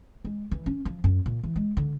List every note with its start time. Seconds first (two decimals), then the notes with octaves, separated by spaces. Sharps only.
0.25 G#3
0.51 E3
0.66 C#4
0.85 F3
1.04 F#2
1.26 A#2
1.43 E3
1.56 G#3
1.77 D3